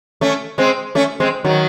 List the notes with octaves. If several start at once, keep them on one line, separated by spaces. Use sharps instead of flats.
A3 C#4
G#3 C4
A3 C#4
G#3 C4
D#3 F#3